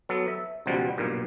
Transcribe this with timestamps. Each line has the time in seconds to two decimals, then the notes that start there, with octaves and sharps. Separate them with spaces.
0.09 F#3 B3 A4
0.28 E5
0.66 C#2 B2 F3 G3 F#5
0.98 B1 G2 A#2